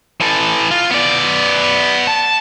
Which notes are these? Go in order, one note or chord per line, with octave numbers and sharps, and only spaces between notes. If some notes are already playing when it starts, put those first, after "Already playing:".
E3 A4
F4
B3 D5
A5